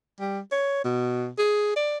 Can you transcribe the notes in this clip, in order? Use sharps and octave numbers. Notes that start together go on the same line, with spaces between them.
G3
C#5
B2
G#4
D5